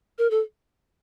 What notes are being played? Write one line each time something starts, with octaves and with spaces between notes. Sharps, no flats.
A#4
A4